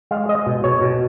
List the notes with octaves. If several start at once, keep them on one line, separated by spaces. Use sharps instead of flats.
G#3 F5
G#3 D#5
B2
B2 C#5
B2